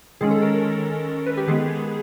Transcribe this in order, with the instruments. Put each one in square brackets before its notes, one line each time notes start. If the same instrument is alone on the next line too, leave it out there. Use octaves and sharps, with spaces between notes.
[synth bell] D#3 G#3 C#4 G#4
A4
A#4
B4
G4
D#3 G#3 B3 G#4